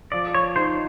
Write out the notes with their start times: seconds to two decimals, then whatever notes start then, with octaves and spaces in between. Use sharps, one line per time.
0.12 F3 D5
0.34 C#5
0.56 D#4 C5